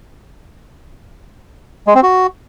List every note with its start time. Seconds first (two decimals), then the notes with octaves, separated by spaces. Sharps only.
1.87 G#3
1.95 C4
2.03 F#4